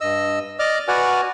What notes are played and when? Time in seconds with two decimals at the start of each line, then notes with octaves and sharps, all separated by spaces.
0.01 G2 D#5 E6
0.59 D5 D#5 D6 F6
0.88 F#4 B4 D5 F#5 G#5 F6